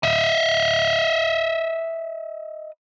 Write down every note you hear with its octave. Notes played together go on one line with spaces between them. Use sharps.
D#5 E5